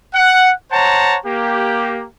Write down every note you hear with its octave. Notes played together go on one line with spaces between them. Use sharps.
F#5
C5 C#5 F#5 A5 A#5
A#3 G4